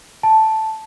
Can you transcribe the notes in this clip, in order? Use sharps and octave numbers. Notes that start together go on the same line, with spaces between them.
A5